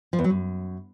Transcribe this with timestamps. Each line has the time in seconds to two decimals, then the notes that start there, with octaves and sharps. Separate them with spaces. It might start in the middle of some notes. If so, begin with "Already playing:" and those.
0.13 F3
0.19 E2
0.24 F#3
0.30 F#2